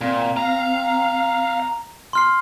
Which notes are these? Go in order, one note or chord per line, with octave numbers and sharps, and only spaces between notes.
A#2 C4
F5 A#5
C6 F6 C7